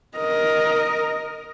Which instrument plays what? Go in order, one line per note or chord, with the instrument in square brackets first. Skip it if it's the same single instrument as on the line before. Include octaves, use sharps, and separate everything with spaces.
[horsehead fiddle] A#4 D#5